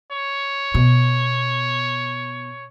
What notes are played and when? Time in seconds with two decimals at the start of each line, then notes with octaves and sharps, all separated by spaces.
0.12 C#5
0.74 B2